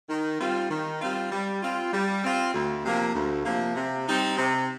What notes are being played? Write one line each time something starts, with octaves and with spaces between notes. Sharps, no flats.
D#3
G3 C4 F4
D#3
G3 C4 F4
G3
C4 F4
G3
C4 F4
D2
C3 F3 A#3
D2
C3 F3 A#3
C3
G3 C4 D#4
C3